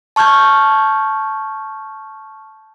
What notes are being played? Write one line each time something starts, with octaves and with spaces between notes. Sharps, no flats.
A5 C#6 F6 G6 G#6